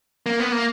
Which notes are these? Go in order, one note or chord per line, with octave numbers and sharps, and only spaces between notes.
A#3
B3
A#3